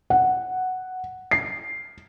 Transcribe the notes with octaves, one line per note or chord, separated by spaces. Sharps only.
F#5
C7